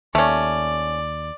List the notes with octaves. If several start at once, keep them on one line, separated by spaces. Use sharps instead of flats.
D#2 A3 C#4 D5